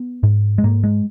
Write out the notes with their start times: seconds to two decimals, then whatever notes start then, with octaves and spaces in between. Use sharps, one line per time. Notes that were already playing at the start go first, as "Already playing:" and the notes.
Already playing: B3
0.23 G#2
0.58 G#3
0.64 G#2 A#3
0.84 G#3